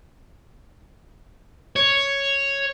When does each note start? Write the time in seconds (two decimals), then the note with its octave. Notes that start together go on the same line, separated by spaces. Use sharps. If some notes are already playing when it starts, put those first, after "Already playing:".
1.76 C#5